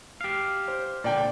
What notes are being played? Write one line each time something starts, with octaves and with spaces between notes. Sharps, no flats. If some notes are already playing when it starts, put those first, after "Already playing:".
G4 F5
C5
A#2 D3 D5 G5